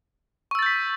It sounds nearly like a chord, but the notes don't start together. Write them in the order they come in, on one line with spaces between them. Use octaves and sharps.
C#6 E6 A6 G6 B6